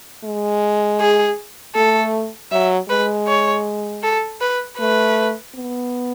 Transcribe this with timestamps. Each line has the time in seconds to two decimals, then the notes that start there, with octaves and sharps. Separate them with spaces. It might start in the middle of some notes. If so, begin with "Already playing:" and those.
0.24 G#3
1.00 G#4
1.75 A3 A4
2.51 F#3 E5
2.89 G#3 B4
3.27 C#5
4.03 A4
4.41 B4
4.79 A3 B4
5.55 B3